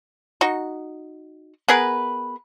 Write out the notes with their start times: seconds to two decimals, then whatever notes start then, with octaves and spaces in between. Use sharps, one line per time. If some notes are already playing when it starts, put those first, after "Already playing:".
0.41 D#4 F#4
1.68 B3 G#4 A#4 B4